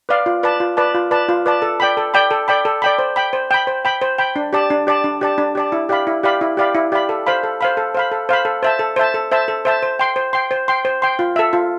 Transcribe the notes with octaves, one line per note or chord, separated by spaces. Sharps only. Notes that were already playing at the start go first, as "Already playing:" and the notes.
B4 D5 F5
F4
B4 D5 A5
F4
B4 D5 A5
F4
B4 D5 A5
F4
B4 D5 A5
A4
D5 G5 B5
A4
D5 G5 B5
A4
D5 G5 B5
A4
D5 G5 B5
C5
G5 B5
C5
G5 B5
C5
G5 B5
C5
G5 B5
D4
G4 D5 A5
D4
G4 D5 A5
D4
G4 D5 A5
D4
G4 D5 A5
E4
G4 D5 F5 B5
E4
G4 D5 F5 B5
E4
G4 D5 F5 B5
E4
G4 D5 F5 B5
A4
C5 F5 B5
A4
C5 F5 B5
A4
C5 F5 B5
A4
C5 F5 B5
A4
C5 E5 A5
A4
C5 E5 A5
A4
C5 E5 A5
A4
C5 E5 A5
C5
G5 C6
C5
G5 C6
C5
G5 C6
C5
G5 C6
F4
A4 E5
F4